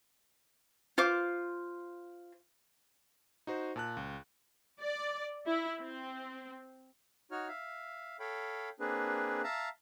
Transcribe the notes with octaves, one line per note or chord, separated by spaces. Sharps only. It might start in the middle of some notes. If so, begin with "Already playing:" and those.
F4 C5 D6
D#4 F#4 C5
A#2 A5 F#6
C#2
D5
E4
C4
D#4 F#4 C#5 F6
E5 F5
A4 C#5 F5 G5 B5
A#3 C4 D4 G#4 B4
E5 F5 A5 A#5